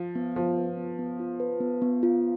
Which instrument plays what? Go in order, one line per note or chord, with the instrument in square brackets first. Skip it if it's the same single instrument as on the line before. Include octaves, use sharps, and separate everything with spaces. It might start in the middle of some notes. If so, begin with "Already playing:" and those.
Already playing: [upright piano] F3
[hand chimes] B3
[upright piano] F3 [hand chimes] F4
[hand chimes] B4
B3
B3
F4
B4
B3
B3
F4